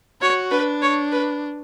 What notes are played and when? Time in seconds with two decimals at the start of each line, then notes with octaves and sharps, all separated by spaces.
0.22 F#4 C#5
0.51 D4 B4
0.82 C#5
1.12 B4